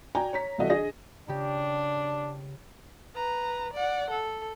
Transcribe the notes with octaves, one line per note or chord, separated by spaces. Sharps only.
F#4 D5 G5 G#5 A#5
C#5 A#5 B6
C2 E3 F#4 A4 D#5 F#5
D3 G#4 D#5 A#6
C#3 D4 G4
B4 A#5
D5 F#5
A4